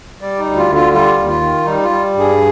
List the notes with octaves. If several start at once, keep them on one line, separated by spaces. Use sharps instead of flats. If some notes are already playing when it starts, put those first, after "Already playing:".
G3 D5
D#4
D2
F4
D3
F4
G3 F4
D#2
F4
D#3
G3 D#4
F4
G3
G2
G#4